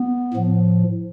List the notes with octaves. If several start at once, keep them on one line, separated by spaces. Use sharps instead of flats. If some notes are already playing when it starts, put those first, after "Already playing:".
Already playing: B3
A2 F3